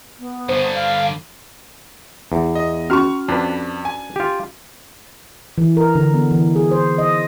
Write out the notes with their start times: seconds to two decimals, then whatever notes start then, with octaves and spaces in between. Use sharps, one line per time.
0.19 B3
0.49 G2 D3 C5
0.74 F5
2.32 E2
2.55 D#5
2.90 C#4 F#4 A#5 C#6 F6
3.28 F2 D4 B4
3.85 G#5
4.16 F4 G4
5.58 E3
5.77 A#4
5.95 D3
6.14 B3
6.31 E3
6.56 G#4
6.71 C5
6.98 D#5